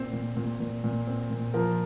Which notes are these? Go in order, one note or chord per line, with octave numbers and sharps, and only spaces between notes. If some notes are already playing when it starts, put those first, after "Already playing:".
Already playing: A#2 C4 C5
A#2
A#2
A#2
A#2
C4
A#2
F3 A#4